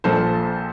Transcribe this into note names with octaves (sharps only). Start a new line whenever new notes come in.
A#1 A#2 F3 A4 C5